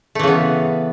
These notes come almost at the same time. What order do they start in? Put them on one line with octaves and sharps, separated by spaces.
A3 E3 C#3 B3